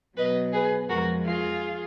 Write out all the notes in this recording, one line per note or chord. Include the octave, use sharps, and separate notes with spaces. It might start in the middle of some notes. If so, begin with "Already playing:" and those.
B2 F#3 B4 D#5
G#4 B4
F2 F3 G#3 F#4 A#4
F4 G#4